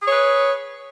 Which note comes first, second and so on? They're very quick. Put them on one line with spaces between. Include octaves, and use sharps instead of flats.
G#4 C#5 B4